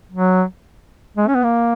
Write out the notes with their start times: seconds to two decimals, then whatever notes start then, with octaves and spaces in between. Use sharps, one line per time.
0.12 F#3
1.17 G#3
1.28 C#4
1.35 B3
1.44 A#3